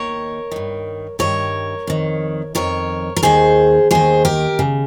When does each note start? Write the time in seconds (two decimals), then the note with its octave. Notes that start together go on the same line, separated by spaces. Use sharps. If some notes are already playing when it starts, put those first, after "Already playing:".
Already playing: D#2 D#3 A#4 C#5
0.51 G2 D#3
1.19 G2 D#3 A#4 C#5
1.87 F2 D#3
2.55 F2 D#3 A#4 C#5
3.16 A#4
3.23 D#2 D#3 G#4 C5
3.91 D#2 D#3 G#4 C5
4.25 G4 A#4
4.59 C#3